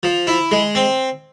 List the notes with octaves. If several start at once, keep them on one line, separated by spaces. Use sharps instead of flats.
F3
E4
G#3
C4